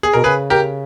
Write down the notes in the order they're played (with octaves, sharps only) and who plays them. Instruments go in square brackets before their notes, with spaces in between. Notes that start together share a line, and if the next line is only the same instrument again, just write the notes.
[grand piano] G#4
[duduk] B2 [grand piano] A#4
[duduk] C#3 [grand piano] G#4 B4
[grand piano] G4 A#4